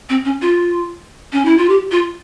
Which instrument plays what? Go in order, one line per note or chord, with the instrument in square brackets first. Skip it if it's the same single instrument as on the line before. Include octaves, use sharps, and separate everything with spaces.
[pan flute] C4
C#4
F4
C#4
E4
F4
G4
F4